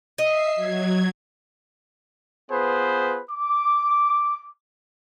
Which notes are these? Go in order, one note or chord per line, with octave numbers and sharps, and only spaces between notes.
D#5 E5 C7
F#3 G#6
B3 F4 G#4 B4 C5
D6